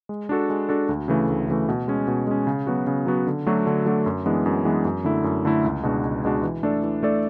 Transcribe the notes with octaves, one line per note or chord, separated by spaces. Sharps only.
G#3
D4 F#4 A4
G#3
D4 F#4 A4
D2
C#3 E3 A3
D2
C#3 E3 A3
B2
G#3 C#4
B2
G#3 C#4
C#3
F#3 B3 F#4
C#3
F#3 B3 F#4
D3
F#3 A3 D4 F#4
D3
F#3 A3 D4 F#4
F#2
E3 G#3 B3 D4
F#2
E3 G#3 B3 D4
F#2
D3 A3 E4
F#2
D3 A3 E4
C#2
B2 G#3 D4 F#4
C#2
B2 G#3 D4 F#4
E3
A3 D4 A4 D5
E3
A3 D4 A4 D5